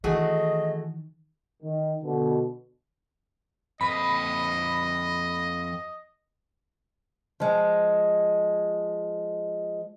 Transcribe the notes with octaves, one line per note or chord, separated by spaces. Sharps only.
D#3 E3 A3 F#4 G#4 D#5
D#3
B2 D3
F2 B4 D#5 B5
F3 G#3